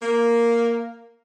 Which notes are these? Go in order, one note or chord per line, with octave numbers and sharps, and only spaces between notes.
A#3